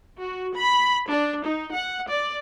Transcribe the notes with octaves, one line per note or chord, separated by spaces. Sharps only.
F#4
B5
D4
D#4
F#5
D5